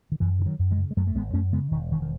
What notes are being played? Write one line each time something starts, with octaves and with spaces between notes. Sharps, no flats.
D#3
F#2 E3
C#3
D#3 F#3
F#2
E3 G#3
C#3
G#3
F#2 F#3 A3
A3
G#1 G#3 B3
F#2 A3 C#4
C#3 G#3 B3
E1 D#3
E1 D#3
D#3